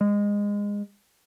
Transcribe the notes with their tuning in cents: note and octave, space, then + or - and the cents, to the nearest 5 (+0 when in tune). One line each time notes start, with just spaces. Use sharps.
G#3 -20